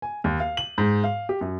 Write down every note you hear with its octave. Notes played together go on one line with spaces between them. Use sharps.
G#5
D#2
F5
F#7
G#2
F5
G4
F#2